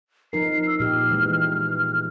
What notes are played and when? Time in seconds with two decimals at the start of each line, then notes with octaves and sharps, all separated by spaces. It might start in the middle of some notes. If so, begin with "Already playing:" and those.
0.33 F3 D#4 A#4 C7
0.67 E6
0.80 A#2 F3 G4 F6
1.11 E3 G#3